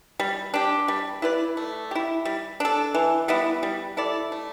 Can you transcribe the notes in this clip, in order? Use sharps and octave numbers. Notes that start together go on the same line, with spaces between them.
G3
D4 G4
G3
E4 B4 D5
A3
E4 G4
G3
D4 A4
E3
G3 B3 E4
G3
E4 A4 D5
A3